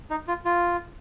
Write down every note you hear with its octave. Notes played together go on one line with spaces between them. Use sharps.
D#4
F4
F4